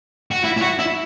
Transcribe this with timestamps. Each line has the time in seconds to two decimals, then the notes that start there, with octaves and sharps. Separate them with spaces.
0.31 F#4
0.44 E4
0.57 E4
0.62 F#4
0.79 E4